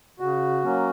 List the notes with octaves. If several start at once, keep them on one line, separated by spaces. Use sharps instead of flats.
C#3 F#4
F#3 A#3 C#4